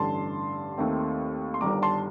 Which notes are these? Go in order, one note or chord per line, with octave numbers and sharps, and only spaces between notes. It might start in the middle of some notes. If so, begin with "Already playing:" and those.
Already playing: A1 G2 D3 A5 C6
D#2 D#3 A3 C4
C6
G1 G2 D#3 G3 A#5 D6
A5 C6